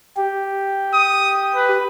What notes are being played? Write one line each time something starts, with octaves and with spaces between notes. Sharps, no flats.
G4
D#6
B4